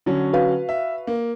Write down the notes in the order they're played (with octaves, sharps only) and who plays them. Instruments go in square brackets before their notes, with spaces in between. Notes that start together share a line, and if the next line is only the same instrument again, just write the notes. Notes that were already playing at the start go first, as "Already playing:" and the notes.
[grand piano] D3 F#3 C#4
[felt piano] F#4 B4 F5
[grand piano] E5
A#3